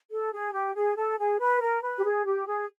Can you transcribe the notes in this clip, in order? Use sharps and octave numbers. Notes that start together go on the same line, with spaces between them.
A4
G#4
G4
G#4
A4
G#4
B4
A#4
B4
G4
G#4
G4
G#4